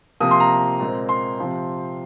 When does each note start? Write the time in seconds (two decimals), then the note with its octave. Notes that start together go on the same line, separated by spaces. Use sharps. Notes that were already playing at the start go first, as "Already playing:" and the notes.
0.20 C3 F3 A#3 D#6
0.31 C6
0.40 A#5
0.80 A#2 G#3 C4
1.09 C6
1.38 C3 F3 C4